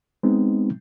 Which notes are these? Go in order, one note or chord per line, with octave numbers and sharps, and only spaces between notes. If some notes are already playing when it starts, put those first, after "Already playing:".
G#3 B3 C4 D#4